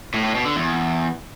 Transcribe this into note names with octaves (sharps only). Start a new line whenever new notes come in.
A2
A2
B2
D3
E2